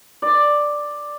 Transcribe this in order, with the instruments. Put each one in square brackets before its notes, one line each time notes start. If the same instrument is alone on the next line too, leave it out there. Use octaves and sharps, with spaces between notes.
[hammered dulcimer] D5